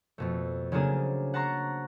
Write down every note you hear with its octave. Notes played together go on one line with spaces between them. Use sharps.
F2 B2 A3
C#3 F#3 A#3 C4 D4 G#4
F#5 A5 A#5 C6 C#6